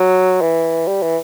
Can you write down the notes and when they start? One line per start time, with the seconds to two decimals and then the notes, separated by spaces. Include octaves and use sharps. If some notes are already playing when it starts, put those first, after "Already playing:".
Already playing: F#3
0.42 E3
0.87 G3
1.02 E3